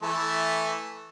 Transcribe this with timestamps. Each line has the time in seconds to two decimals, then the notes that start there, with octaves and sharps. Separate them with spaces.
0.03 E3 A3 A4